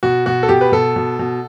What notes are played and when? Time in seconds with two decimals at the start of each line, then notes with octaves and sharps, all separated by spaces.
0.03 B2 F#4
0.26 B2 F#4
0.43 A4
0.49 B2 G4
0.61 B4
0.72 B2 A4
0.96 B2
1.19 B2